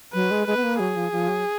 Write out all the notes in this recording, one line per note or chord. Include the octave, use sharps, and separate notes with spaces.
F#3 B4
G#3
G#3 B4
B3
A#3
F#3 G#4
F3
F3
F#3